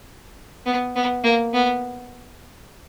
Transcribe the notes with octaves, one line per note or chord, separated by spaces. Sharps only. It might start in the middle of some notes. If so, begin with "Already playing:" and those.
B3
B3
A#3
B3